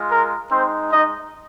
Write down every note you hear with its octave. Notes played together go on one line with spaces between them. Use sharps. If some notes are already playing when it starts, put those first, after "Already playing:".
Already playing: G#3 F4
A#4
G#3 C4 D#4 C5
D#4 D#5